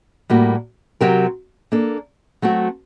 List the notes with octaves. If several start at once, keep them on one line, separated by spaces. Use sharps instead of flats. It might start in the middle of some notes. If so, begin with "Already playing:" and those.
A2 G3 A#3 F#4
C3 F#3 C4 G4 A#4
A#3 D4 A4
F#3 A3 C4 F#4